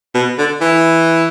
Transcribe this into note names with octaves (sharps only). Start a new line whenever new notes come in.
B2
D3
E3